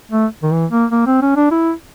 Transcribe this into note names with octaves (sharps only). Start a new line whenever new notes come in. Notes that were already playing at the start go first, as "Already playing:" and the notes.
A3
D#3
E3
A#3
A#3
C4
C#4
D4
E4